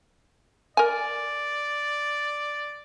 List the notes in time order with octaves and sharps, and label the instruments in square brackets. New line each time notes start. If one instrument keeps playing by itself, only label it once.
[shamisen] A#4 G#5 [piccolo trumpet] D5